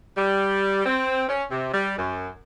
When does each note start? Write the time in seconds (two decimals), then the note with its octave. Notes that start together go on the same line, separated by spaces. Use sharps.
0.17 G3
0.86 C4
1.29 C#4
1.50 C3
1.72 G3
1.97 F#2